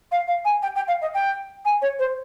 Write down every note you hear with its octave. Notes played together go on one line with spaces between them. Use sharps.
F5
F5
G#5
G5
G5
F5
D#5
G5
G#5
C#5
C5